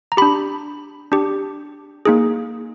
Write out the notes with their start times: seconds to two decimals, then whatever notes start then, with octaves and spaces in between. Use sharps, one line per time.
0.12 A#5
0.17 D4 G4 B5
1.12 D4 G4
2.05 A#3 D#4 G#4